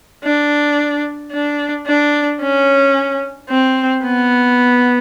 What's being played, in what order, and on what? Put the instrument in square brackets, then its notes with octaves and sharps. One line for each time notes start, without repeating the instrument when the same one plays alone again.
[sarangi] D4
D4
D4
C#4
C4
B3